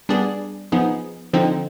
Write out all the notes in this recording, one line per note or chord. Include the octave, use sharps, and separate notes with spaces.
G3 B3 D4 G#4 D5
F3 B3 D#4 G#4
D3 F3 C4 D#4